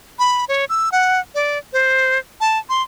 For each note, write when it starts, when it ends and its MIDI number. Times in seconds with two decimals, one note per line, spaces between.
0.19 0.45 83
0.49 0.65 73
0.69 0.89 88
0.92 1.20 78
1.35 1.58 74
1.73 2.18 72
2.41 2.59 81
2.69 2.83 84